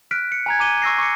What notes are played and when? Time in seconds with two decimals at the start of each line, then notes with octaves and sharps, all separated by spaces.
0.11 F6 F#6 B6 D7
0.32 C#7
0.46 G#5 A#5 G#6
0.59 A#5 D6 D#7 G7
0.82 C#6 E6 A#6 C7
0.98 C#6 D6 C7 C#7